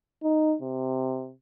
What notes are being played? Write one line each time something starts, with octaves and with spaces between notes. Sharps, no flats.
D#4
C3